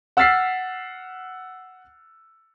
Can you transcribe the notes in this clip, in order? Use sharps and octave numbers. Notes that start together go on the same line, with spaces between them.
F#5 E6 F6 A6 B6 C7